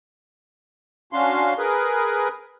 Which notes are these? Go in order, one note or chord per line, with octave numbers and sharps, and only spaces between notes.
C#4 D4 F#4 F5 C6
G#4 A#4 B4